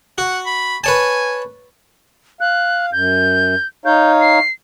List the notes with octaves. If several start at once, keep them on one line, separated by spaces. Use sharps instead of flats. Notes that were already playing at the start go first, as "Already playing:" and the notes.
F#4 F#5
B5
B4 C#5 G#5 A5
F5 F#6
F#2 G6
D#4 C#5 F5 G6
C7